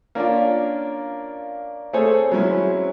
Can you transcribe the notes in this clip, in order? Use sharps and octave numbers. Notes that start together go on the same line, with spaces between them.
A#3 C#4 D4 F4
A3 C4 G#4 A4 C5 C#5
F#3 G#3 C4 C#4 E4